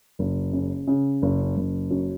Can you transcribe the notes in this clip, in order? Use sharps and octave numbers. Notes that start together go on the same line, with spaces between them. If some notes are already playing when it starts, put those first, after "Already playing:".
F#1
C#3
C#3
F#1
F#1
F#2